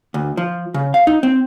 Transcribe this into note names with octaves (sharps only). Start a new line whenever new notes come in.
D2
F3
C#3
F5
D#4
C4